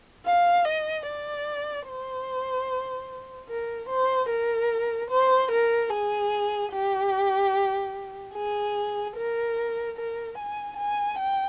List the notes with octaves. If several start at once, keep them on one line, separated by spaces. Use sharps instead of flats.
F5
D#5
D5
C5
A#4
C5
A#4
C5
A#4
G#4
G4
G#4
A#4
A#4
G#5
G#5
G5